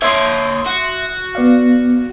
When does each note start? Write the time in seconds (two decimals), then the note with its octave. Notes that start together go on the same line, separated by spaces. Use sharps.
0.02 A#3 C#5 E5 C6 D#6
0.67 F#4
1.35 B3 D5 F5